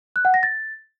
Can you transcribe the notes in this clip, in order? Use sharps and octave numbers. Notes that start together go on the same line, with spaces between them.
F#6
F#5
A#6
A6